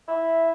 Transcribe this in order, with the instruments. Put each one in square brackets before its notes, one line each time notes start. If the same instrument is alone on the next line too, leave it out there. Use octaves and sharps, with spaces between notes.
[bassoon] E4 [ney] E5